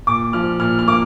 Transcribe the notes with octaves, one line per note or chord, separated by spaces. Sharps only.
A#2 D6
F3 F6
A#2 F6
F6
A#3 D6